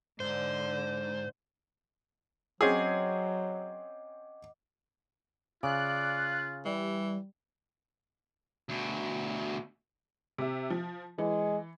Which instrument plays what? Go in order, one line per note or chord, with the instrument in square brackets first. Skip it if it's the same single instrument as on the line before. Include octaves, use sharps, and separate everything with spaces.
[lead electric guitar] G#2 [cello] D3 [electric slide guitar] C5
[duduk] F#3 [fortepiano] C4 C#4 G#4 [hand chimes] D#5 F#5 D6
[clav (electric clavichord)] C#3 [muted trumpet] F4 [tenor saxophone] D5 [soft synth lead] F#6
[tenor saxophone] E3 [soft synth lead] G3
[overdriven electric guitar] D2 B2
[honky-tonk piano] C3 E5
F3
[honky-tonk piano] E3 [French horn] G#3